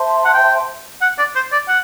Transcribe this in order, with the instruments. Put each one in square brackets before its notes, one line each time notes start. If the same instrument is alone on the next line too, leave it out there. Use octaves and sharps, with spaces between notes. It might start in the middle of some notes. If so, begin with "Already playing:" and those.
Already playing: [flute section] C5 E5 A5 C6
[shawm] F#5
G5
F#5
D5
C5
D5
F#5